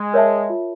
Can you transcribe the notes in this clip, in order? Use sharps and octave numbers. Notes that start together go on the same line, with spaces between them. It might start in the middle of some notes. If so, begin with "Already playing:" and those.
Already playing: G#3
A#4 C#5 E5 A5
F4